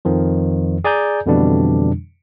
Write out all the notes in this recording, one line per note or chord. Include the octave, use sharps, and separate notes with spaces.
F2 D#3 F3
G#4 D5 G#5 A#5 G6
F2 B2 D3 E3 G3 D4